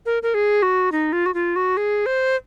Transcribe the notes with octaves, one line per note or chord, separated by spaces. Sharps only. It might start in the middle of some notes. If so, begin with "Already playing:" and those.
A#4
A#4
G#4
F#4
D#4
F4
F#4
F4
F#4
G#4
C5